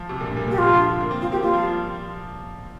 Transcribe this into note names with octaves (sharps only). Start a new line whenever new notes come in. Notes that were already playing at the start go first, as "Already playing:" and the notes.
Already playing: F3
C3
A#2
G2
A#2
A#2 G4
C3 F4
F3
D3
A#3
C4
C4 F4
A#3 G4
G3 F4
F3